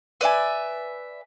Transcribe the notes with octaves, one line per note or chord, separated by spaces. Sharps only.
B4 D5 E5 G#5